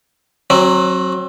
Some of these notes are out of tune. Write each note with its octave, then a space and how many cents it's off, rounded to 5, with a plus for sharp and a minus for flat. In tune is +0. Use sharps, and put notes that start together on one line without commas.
F#3 +0 C4 +30